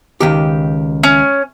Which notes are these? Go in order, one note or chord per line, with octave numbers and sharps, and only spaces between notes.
C#2 D#3 G4
C#4